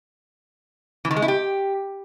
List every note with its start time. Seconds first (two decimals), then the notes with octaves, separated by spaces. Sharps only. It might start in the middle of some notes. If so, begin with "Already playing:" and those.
1.05 E3
1.11 D#3
1.16 G#3
1.22 E4
1.28 G4